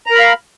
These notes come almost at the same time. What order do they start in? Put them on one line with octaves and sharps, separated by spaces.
A#5 A#4 B5 F5